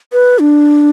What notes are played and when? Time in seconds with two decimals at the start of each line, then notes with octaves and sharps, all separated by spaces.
0.12 B4
0.39 D4